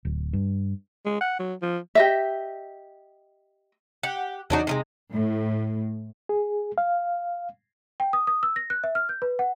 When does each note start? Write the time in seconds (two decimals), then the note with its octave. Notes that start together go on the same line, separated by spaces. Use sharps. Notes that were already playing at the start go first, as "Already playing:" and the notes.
0.05 D1
0.33 G2
1.06 G#3
1.21 F#5
1.40 F#3
1.62 F3
1.95 G4 D#5 E5
4.03 G4 F#5
4.50 E2 F#3 D4 D#4 F#4
4.67 C3 F3 G#3
5.12 A2
6.29 G#4
6.78 F5
8.00 G5
8.13 D#6
8.27 D#6
8.43 E6
8.56 A#6
8.70 F#6
8.84 E5
8.95 F6
9.09 G6
9.22 B4
9.39 F#5